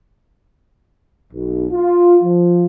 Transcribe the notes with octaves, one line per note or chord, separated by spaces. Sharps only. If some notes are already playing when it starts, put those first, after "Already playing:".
B1
F4
F3